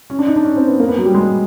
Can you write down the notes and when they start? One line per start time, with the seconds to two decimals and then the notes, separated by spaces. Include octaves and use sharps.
0.10 C#4
0.19 D4
0.27 D#4
0.36 D4
0.45 C#4
0.56 C4
0.68 B3
0.80 A#3
0.89 B3
0.97 F#3
1.06 G3
1.15 G#3